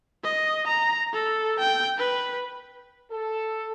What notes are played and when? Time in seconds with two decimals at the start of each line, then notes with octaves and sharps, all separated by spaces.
0.24 D#5
0.67 A#5
1.13 A4
1.60 G5
1.98 B4
3.12 A4